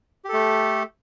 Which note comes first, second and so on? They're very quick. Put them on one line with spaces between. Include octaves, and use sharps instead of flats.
G4 A4 A3